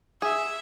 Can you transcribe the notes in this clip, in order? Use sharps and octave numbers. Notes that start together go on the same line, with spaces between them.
G#4 E5